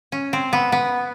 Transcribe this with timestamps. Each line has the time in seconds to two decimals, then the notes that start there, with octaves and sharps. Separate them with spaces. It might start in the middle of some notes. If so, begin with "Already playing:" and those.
0.12 C#4
0.33 C4
0.53 B3
0.72 B3